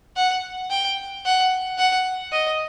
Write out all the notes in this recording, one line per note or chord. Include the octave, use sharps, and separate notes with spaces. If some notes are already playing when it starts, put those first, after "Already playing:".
F#5
G5
F#5
F#5
D#5